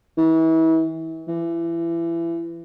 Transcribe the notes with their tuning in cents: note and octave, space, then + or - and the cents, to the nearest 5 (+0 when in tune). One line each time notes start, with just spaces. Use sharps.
E3 -35
E3 +25